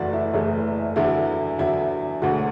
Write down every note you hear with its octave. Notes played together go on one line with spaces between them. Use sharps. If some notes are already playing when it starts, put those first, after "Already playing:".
Already playing: F#1 E2 E3 A3 F#4 D5
E4
F#1 E2 E3 A3
E2 D3 F#3 E4
E2 D3 F#3 E4
E1 D2 D3 F#4